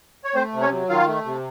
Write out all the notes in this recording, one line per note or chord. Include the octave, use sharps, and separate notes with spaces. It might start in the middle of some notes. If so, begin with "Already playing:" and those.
C#5
A3 C4 C5
C3
C#4 C#5
F#3
D#3 F4 F5
A3
C3